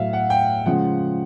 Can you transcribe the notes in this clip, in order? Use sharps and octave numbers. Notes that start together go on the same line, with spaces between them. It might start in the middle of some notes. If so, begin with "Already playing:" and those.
Already playing: A2 F#3 E5 F5
F#5
G5
C#3 F3 G#3 F#5